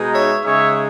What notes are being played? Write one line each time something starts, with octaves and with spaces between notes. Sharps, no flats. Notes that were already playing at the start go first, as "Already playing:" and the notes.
Already playing: B2 G#3 D#4
C#5 E5
C#3 G#3 D#4 C#5 E5